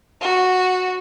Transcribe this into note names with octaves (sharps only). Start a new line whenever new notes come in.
F#4